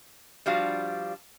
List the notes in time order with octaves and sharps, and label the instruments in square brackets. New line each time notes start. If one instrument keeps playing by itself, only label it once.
[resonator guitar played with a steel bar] F3 G3 D4 F#4 F5